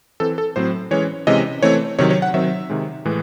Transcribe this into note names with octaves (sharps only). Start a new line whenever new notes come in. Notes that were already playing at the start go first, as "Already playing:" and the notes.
E3 C4 A4
A4
A2 F#3 C4 C5
E3 G#3 C#4 C#5
C3 E3 G#3 C#4 D#5
E3 A3 C4 C#5
C3 D#3 F#3 C#5
C#5
F#5
D#3 F#3 C4 E5
C3 D#3 G#3
A2 E3 G#3